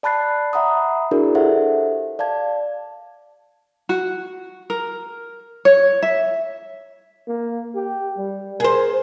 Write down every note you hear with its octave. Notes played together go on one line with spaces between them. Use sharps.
D5 A5 B5 F#6 A6 C7
E5 F#5 A#5 B5 D#6
D4 E4 F#4 G#4 A#4 D5
G4 A4 C5 E5 F#5
D5 F5 A5 G#6
F#4
A#4
C#5
E5
A#3
G4
G3
G#4 A#4 C5